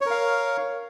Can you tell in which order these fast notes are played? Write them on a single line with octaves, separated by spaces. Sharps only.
C#5 A#4 F5